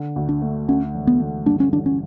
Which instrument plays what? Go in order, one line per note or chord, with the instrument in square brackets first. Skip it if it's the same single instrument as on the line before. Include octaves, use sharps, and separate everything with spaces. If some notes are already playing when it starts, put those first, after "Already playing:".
Already playing: [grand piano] D3
D2
[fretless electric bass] D4
[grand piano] A3
[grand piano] D2 [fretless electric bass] C#4
[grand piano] E1
[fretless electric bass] B3
[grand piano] D3
[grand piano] G2 [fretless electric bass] D4
[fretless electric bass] C#4
[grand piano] A1 [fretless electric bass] D4
[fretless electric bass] C#4